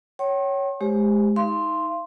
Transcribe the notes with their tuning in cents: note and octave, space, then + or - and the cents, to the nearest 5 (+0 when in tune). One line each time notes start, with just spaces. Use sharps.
C#5 +0 G5 -35 C6 +45
G#3 +25 G4 +20 C5 +0
D#4 +30 F5 -35 C6 +0